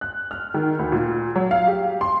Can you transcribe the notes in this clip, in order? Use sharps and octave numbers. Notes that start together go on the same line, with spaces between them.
F#6
F6
D#3
D2
A#2
F#3
F5
G4
C6